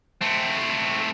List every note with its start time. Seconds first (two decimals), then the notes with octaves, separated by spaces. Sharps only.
0.22 A3 C4